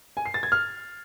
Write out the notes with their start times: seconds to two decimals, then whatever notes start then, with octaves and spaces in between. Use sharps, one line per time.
0.17 G#5
0.26 C7
0.34 A6
0.43 G#6
0.52 F6